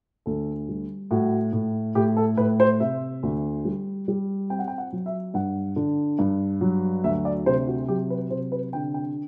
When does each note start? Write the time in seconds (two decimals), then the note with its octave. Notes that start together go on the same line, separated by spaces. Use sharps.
0.26 D2 A4
0.69 G3
1.11 A2 F#4
1.53 A2
1.95 A2 G4
2.17 A4
2.37 A2 B4
2.60 C5
2.80 C3 E5
3.23 D2
3.65 G3
4.08 G3
4.50 C4 G5
4.59 F#5
4.68 G5
4.78 F#5
4.93 F#3
5.06 E5
5.34 G2 F#5
5.76 D3
6.19 G2
6.61 F#3
7.04 D2 E5
7.25 D5
7.46 C3 C5
7.67 F#4
7.88 F#3 G4
8.10 B4
8.30 C3 C5
8.52 B4
8.73 D3 G5
8.94 G5